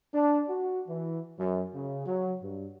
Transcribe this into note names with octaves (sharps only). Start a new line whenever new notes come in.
D4
F#4
E3
F#2
C#3
F#3
G2